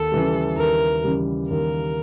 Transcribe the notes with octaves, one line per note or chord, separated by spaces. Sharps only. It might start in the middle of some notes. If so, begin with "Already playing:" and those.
Already playing: D#2 A4
C#3 E3 G3
D#2 A#4
C#3 E3 G3
D#2 A#4